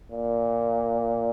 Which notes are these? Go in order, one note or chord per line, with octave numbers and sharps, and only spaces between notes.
A#2